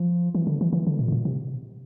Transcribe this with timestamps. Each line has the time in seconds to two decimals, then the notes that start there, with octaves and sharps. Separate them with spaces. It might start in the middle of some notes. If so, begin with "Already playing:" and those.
Already playing: F3
0.35 E3
0.47 D3
0.61 E3
0.73 E3
0.87 D3
0.99 A#2
1.08 A2
1.12 A#2
1.25 C3